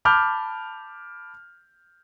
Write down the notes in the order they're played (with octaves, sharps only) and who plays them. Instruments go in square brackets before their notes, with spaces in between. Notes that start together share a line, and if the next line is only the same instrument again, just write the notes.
[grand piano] A5 B5 D6 F6 G6